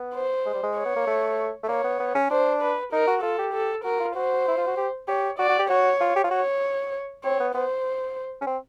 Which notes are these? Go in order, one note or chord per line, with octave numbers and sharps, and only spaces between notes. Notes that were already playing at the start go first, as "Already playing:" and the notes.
Already playing: B3
C5
G#3
G3
G#3
C#5
B3
A#3
A3
A3
A#3 C#5
B3
B3
C#4
D4 C5
B4
D#4 A#4
F#4
F4 A4
G4
A4
F#4 A#4
F4
F#4 C5
E4
F4
F#4
G4
G4 C#5
F#4 D5
F#4
G4
F#4 C#5
F4
G4
F4
F#4 C#5
C4 C#5
B3
B3 C5
C#4
C4